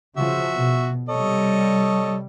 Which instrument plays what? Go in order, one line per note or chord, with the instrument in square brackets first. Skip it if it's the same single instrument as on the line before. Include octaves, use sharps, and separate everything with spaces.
[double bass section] C#3 F3 [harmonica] F#4 E5
[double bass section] B2
[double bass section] C3 G3 [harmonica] A4 C#5 D#5